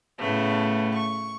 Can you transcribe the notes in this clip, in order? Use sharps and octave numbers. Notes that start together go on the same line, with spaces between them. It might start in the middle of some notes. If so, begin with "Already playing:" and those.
A2 C#3 A3 B3
C#6